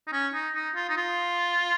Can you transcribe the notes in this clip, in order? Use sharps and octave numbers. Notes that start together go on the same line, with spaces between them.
D#4
C#4
D#4
D#4
F4
D#4
F4